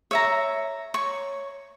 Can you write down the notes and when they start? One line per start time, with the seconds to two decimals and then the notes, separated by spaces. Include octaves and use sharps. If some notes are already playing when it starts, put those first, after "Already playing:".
0.11 C#5 E5 A#5
0.94 C#5 C#6